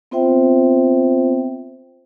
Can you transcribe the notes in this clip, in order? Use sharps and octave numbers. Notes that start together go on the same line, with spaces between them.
B3 C4 F4 C5 E5 G5